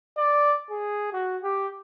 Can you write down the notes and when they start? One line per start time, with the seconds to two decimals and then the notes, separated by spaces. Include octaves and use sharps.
0.17 D5
0.71 G#4
1.13 F#4
1.43 G4